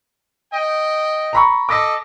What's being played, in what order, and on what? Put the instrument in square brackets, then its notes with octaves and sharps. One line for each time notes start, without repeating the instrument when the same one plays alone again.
[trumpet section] D#5 G5
[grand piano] A#5 B5 C#6
[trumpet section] A4 D#5 [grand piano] D6 A#6 B6